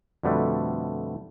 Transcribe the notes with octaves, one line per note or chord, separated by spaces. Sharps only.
F2 B2 D3 G3 A3